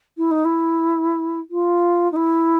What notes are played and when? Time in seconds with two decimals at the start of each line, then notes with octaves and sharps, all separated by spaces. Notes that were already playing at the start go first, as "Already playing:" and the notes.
0.17 E4
0.31 D#4
0.45 E4
1.50 F4
2.12 D#4
2.16 E4